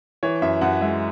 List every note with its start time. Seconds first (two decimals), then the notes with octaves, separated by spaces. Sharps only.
0.23 E3 C#5
0.42 F#2 E5
0.61 F#2 F#5
0.81 G#3 E5